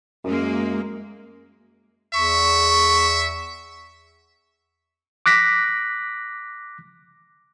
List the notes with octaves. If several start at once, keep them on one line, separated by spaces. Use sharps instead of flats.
F#2 G#3 A#3
E2 E5 C#6
D6 F#6 A#6 B6